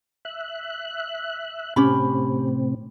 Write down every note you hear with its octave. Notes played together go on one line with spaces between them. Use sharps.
E5 F#6
A2 C3 C4 C#4 G4 B5